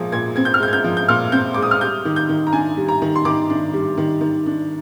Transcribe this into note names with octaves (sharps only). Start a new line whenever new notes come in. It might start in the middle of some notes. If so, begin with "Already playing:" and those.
Already playing: A#2 F3 G#3 G#6
A#2 G#6
C4 G#6
G6
F6
G#3 G6
G#6
G6
F3
G6
A#2 F6
C4 G6
G#3 D6
D#6
F6
G3 G6
D#3
G6
D#3
A#5
D4 G#5
G3
A#5
D#3
C6
D#3 D6
D4
G3
D#3
D#3
D4